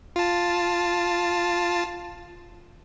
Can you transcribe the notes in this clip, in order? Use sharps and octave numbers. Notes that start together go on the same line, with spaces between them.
F4 A5